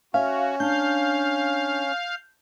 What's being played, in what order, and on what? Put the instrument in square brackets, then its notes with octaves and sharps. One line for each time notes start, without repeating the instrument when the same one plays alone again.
[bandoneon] C#4 [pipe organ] F#4 [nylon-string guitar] E5 [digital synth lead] F5
[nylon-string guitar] D4 [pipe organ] F5 [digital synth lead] G6